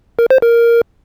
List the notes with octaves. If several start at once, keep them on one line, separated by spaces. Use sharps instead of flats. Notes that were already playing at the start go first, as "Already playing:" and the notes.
A#4
C5
A#4